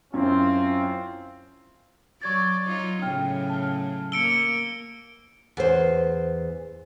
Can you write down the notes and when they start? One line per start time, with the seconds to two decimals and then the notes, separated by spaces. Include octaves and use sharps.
0.14 F#2 C4 E4 F4
2.22 F#3 D5 C#6 G#6 A6
2.65 F#3 D#4 F4
3.02 A2 C#3 F#3 G5 F6
3.49 A5 F6
4.12 A#3 E6 C#7 D7 G7
5.57 E2 C5